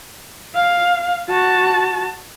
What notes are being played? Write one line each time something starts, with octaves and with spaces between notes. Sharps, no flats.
F5
F#4 A5